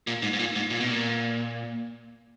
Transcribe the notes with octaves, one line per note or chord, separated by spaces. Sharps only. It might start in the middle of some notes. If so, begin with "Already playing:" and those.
A#2
G#2
G#2
A#2
G#2
A#2
B2
A#2